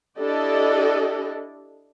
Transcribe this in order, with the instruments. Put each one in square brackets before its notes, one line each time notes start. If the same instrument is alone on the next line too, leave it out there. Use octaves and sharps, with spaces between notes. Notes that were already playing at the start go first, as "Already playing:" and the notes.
[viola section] D4 E4 G4 A4 D5 D#5